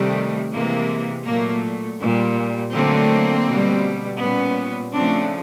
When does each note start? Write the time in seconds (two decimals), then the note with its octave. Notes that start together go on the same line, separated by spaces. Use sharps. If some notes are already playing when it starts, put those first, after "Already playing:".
Already playing: C3 D#3 G3 A3
0.52 C3 E3 G#3 A#3
1.25 A#2 F#3 A3 A#3
2.00 A#2 G3
2.73 D3 F#3 A3 A#3 C4
3.47 B2 G3
4.20 A#2 G3 B3 C#4
4.94 C#3 F3 A3 C4 D4